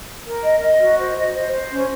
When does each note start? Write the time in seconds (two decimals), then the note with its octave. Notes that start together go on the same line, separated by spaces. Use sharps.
0.25 A#4
0.42 D#5
0.61 D#5
0.79 F#4
0.97 C5
1.16 D#5
1.34 C5
1.52 C5
1.71 C#4